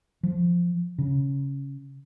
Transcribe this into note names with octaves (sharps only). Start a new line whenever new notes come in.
F3
C#3